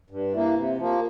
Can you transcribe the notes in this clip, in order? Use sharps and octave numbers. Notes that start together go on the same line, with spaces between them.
G2
E3 A#3
C3
F3 A#3